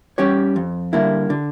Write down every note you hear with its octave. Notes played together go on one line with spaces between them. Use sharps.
G3 C#4 G4 C#5
F2
D3 G3 A#3 E4
D3